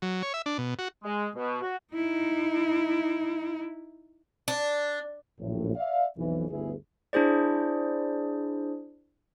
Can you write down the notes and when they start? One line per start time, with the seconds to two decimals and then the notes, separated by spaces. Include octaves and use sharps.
0.02 F#3
0.23 C#5
0.34 E5
0.46 D4
0.58 B2
0.79 F#4
1.04 G#3
1.36 B2
1.62 F#4
1.94 D#4 E4
4.48 D4
5.39 A#1 F#2 A2
5.76 D5 E5 F5
6.17 B1 F2 E3
6.50 G1 D2 B3 E4 G#4
7.13 D4 E4 G#4 C5 D5